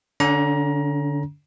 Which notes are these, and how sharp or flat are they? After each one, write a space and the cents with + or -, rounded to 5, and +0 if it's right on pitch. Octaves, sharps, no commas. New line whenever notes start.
D3 -5 C#4 +30 A#5 +25